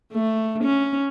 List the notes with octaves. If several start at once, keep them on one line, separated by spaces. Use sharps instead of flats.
A3
C#4